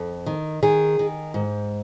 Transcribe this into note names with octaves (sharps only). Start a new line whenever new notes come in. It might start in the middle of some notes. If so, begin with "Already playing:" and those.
Already playing: F2
D#3
D#3 G#4
D#3
G#2